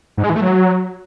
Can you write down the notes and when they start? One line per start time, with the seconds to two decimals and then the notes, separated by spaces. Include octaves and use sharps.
0.17 G#2
0.23 G#3
0.30 E3
0.36 A3
0.42 F#3